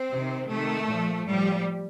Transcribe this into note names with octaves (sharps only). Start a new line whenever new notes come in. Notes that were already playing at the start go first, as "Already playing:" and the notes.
Already playing: C4
C3 D#3
C3 D#3 A3
A#2 F3
A2 F3 G3